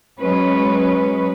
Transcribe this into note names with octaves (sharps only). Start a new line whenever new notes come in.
F#3 G#3 C#4 B4